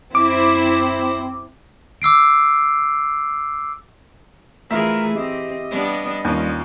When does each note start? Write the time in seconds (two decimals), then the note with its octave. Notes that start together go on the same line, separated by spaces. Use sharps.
0.15 F#2 C4 E4 C5 D6
2.02 D6 E6 C7 D7
4.71 E3 A3 F4 G#4 A#4 E5
5.16 C4 G4 D#5
5.71 G3 B3 D4
6.25 D#2 G3 C#4 F4